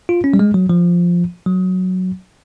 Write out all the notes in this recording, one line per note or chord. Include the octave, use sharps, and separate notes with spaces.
F4
C#4
G3
G#3
F#3
F3
F#3